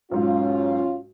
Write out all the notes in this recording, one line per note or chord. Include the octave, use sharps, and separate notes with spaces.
B1 G#2 C#4 F4